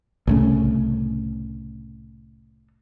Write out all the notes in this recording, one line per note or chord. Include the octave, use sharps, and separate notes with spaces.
C2 A2 C#3